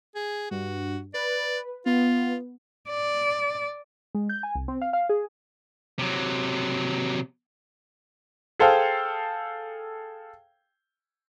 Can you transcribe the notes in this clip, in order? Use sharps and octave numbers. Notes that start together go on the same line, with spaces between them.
G#4
G2 F#4
B4 D5
B3 F4
D5
G#3
G6
G#5
C2
C4
F5
F5
G#4
C3 F#3
G#4 A4 C5 F5 G5